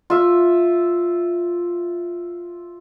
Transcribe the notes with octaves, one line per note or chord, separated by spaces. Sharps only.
F4 E5